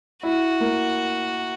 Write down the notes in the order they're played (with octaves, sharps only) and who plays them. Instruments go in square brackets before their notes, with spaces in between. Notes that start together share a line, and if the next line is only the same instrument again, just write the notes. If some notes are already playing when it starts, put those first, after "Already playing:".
[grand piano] E4 [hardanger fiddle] F#4
[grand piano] A#3